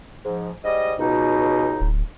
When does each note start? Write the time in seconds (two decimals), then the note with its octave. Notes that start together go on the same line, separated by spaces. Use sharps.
0.25 G#2 F3
0.64 G#2 G3 D#5
0.99 C#2 B2 D#4
1.80 D1